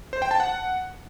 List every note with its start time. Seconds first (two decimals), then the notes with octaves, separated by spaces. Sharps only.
0.13 C5
0.22 G5
0.31 A5
0.40 F#5